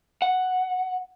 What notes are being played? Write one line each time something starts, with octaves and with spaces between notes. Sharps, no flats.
F#5